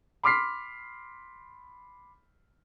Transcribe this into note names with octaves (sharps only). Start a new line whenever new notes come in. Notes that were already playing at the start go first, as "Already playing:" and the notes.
B5 C6 D6 F6 B6 C7